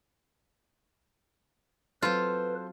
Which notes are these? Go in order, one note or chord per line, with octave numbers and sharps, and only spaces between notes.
F#3 C4 F4 A4 B4 C5